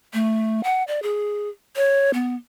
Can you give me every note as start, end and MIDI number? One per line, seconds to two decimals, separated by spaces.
0.14 0.64 57
0.64 0.83 78
0.88 1.02 74
1.03 1.49 68
1.76 2.11 73
2.14 2.36 59